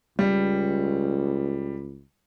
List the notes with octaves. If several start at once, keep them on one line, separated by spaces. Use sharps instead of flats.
C#2 G3